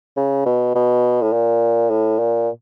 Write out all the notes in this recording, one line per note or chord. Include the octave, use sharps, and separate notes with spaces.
C#3
B2
B2
A2
A#2
A2
A#2